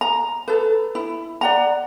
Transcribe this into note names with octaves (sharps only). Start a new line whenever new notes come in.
A#5
A4 B4
E4
D5 F#5 A#5